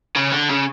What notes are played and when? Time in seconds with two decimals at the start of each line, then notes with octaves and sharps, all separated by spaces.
0.16 C#3
0.32 D3
0.49 C#3